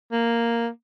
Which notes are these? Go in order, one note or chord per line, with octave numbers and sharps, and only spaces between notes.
A#3